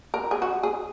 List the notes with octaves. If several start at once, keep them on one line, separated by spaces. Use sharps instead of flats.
A#4
G#4
F#4
G#4